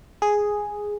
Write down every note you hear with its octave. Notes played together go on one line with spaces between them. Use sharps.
G#4